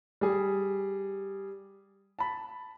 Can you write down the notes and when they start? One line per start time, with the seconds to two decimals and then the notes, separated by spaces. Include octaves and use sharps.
0.21 G3 G#4
2.19 A5 B5